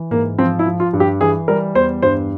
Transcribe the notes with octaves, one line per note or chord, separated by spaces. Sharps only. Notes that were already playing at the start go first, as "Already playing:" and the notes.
Already playing: E3
G#2 A#3
F3 C4
E4
F3
F4
G2
G4
E3 G#4
G3 A#4
E2 C5
G2 C5